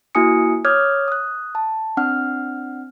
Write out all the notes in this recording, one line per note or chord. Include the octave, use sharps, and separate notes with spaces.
A#3 E4 F#4 G#5 D#6 C#7
C#5 D6 D#6 F6 G6 G#6
D#6 F#6
A5
C4 D4 F#5 F6